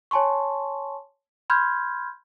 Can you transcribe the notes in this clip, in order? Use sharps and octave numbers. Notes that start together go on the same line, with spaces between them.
C#5 G#5 A5 C6 C#6
B5 C6 F6 G6 G#6